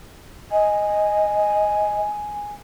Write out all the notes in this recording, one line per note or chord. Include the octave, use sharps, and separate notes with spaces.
D#5 G#5